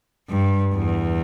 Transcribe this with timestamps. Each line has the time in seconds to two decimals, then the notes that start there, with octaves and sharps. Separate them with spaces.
0.29 G2
0.75 E2